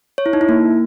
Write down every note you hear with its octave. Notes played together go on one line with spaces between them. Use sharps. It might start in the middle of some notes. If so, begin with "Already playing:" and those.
C#5
E4
D#4
E4
A#3